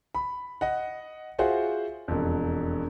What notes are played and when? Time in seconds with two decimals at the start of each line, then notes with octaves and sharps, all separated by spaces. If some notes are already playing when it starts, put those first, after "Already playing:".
0.15 B5
0.61 D#5 F#5
1.38 F4 F#4 G#4 C5 E5 F#5
2.08 E1 F2